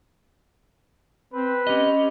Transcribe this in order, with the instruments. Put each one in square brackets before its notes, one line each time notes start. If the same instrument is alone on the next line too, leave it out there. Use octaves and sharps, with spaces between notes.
[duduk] C4 [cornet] B4
[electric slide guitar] C#4 D#5 [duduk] G4